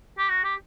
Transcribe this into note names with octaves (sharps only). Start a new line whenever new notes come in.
G4
F#4
G4